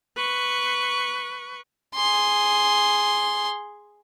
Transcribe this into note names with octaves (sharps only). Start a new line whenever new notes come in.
B4 C#6
G#4 C6